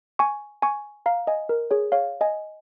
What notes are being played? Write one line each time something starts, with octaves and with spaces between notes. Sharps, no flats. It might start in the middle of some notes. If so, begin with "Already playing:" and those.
G#5 C#6
G#5 C#6
F5 A#5
D#5 G#5
A#4
G#4 C#5
C#5 F5
D#5 G#5